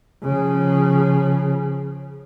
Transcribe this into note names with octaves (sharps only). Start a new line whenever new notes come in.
C#3 F3